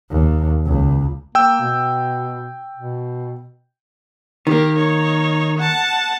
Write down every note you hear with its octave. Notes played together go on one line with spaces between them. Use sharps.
D#2
C#2
A#3 G5 E6
B2
B2
D#3 A#3 G4 A#4
D#4 C#5
F#5 A5